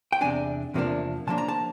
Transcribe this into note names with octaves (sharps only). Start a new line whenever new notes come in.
G5
E2 C3 F3 A#3 D4 G#5
E2 C3 F3 A#3 D4
C#3 F3 A#3 D4 A5
A#5
A5